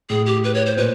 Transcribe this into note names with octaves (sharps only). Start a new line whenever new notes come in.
A2 G#4
G4
B4
C#5
C5
A#2 B4